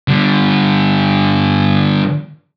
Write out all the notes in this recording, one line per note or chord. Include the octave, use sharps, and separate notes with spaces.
D3 G3